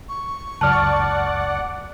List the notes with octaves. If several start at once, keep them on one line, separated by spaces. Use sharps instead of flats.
C#6
C#2 F#2 D5 F#5 A5 F6